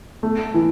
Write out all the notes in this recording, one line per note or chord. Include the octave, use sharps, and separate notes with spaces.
A3
E3